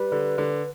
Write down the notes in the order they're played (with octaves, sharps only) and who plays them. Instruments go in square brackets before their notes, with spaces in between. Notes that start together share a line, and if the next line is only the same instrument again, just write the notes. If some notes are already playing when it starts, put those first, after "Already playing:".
Already playing: [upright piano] G3 [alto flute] B4
[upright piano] D3
D3